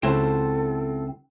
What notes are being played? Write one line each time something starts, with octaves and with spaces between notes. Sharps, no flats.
C#2 C4 E4 F#4 A4 C5 A5